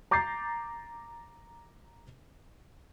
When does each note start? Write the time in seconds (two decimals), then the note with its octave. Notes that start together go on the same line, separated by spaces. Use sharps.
0.11 A#5 D6 G6 A6 C7